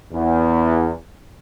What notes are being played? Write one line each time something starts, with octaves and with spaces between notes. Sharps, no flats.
E2